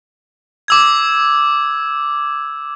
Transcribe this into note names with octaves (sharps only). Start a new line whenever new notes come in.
D6 E6 G#6